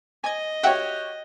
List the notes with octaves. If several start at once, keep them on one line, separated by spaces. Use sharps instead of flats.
D#5 G#5 G#6
F#4 G4 C#5 E5 F#5 G5